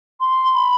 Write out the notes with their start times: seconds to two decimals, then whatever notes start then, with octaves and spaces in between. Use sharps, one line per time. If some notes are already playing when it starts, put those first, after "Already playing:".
0.21 C6
0.54 B5